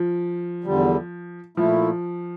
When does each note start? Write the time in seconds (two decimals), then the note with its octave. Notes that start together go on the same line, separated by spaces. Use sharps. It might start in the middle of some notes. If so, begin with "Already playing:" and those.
Already playing: F3
0.64 E2 D3 G3
1.57 A#2 F3 A3 E4